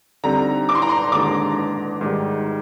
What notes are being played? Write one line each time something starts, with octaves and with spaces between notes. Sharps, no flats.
D3 G3 C4 D#4 A#5
D6
C6
A#5
C6
D#2 D3 G#3 D4 D6
G#2 D#3 G3